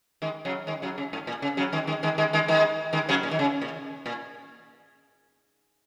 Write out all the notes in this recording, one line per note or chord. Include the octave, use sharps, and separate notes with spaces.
D#3 G#3
C#3 F#3
D#3 G#3
C#3 F#3
C#3
G#2
A#2
C#3
C#3 F#3
D#3 G#3
D#3 G#3
D#3 G#3
D#3 G#3
D#3 G#3
D#3 G#3
D#3 G#3
C#3 F#3
A#2
D#3
C#3
A#2
A#2